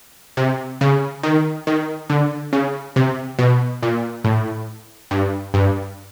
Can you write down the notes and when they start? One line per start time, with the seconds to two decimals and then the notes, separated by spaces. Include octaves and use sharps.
0.37 C3
0.81 C#3
1.23 D#3
1.67 D#3
2.10 D3
2.53 C#3
2.96 C3
3.39 B2
3.83 A#2
4.24 A2
5.11 G2
5.54 G2